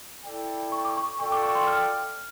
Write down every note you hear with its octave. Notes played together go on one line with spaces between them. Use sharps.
E4 A4 D5 G5
C#6
D6
C#6
F4 A4 D5 G5 C#6
D6
C#6
C6
F6